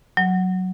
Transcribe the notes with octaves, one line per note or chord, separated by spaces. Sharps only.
F#3